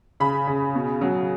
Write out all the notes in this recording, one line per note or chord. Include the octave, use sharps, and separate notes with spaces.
C#3 B5
C#3
B2
F#3